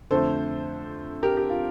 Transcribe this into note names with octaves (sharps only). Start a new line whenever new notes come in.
F2 D3 A3 A4 C5
G4 A#4
G4
F4